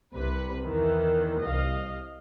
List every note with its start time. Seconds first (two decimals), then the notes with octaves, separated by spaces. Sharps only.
0.14 C2 C3 B4
0.65 E2 D#3 E3
1.44 C2 D#5 F5